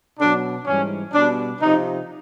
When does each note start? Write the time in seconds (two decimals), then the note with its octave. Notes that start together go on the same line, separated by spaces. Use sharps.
0.19 B2 F#3 D4
0.66 G#2 E3 G3 C#4
1.13 B2 G3 D4
1.61 C3 F3 D#4